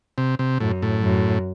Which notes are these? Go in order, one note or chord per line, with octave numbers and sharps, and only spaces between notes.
C3
C3
F#2 A2
A2
F#2